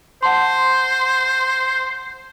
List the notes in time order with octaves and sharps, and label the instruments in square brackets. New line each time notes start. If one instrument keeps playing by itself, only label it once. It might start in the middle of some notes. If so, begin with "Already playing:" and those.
[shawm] C5 [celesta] F#5 A5 C6